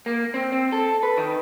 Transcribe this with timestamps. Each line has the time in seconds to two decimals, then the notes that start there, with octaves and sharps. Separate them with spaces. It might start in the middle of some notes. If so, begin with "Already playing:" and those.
0.06 A#3
0.34 C4
0.52 C4
0.72 A4
1.03 B4
1.18 D#3